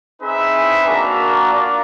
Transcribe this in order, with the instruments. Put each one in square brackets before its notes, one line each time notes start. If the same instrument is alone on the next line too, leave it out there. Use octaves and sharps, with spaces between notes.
[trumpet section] C4 D#4 G#4 B4 E5
A#3 D4 F#4 A#4
F4 A#4 D5